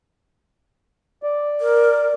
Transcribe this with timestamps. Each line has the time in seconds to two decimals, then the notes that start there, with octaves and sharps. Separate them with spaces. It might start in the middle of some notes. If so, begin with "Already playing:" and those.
1.23 D5
1.61 A#4